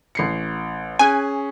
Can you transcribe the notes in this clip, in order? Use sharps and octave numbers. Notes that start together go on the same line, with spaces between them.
A1 C7 C#7
C#4 G#4 G#5 F#6